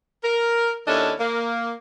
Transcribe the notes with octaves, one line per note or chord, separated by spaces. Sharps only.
A#4
D#2 C#4 D4 E4 A4 D#5
A#3